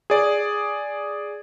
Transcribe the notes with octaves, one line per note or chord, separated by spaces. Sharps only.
G#4 D5